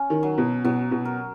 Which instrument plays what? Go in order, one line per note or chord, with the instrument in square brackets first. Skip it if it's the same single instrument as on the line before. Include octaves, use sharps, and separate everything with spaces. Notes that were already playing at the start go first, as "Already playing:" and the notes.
Already playing: [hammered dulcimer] C#4
[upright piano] D#3
[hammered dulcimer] F#3
[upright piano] B2
[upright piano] B2 [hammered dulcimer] F#3
[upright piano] B2
[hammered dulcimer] A#4